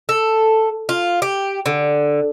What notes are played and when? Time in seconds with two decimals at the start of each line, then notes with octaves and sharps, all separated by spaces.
0.09 A4
0.89 F4
1.22 G4
1.66 D3